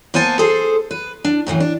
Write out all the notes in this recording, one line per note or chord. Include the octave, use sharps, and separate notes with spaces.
A#3 B3 C5 G#5 A5
G#4 A4 C5
B4
D4
F#2 A2 D3 E3
D4